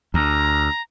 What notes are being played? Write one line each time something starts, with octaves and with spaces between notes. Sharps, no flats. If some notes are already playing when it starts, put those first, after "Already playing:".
D2 A#5